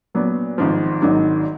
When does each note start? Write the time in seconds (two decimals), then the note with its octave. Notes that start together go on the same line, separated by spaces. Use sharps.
0.15 A#2 F#3 B3 D4
0.58 G#1 G#2 F3
1.01 G#1 G#2 D#3 F#3 D4